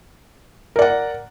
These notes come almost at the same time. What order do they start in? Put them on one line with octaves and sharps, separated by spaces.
A#4 D5 F#5